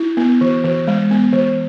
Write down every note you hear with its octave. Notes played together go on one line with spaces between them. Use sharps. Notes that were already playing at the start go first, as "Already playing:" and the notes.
Already playing: E4
B3
E3
E3
G#3
B3
E3